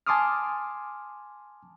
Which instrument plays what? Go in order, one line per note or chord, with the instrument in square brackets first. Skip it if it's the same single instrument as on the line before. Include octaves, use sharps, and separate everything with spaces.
[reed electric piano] G#5 A5 C6 D6 D#6 F6